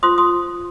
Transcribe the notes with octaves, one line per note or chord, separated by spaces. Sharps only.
F4 C5 C6 D#6
C6 D#6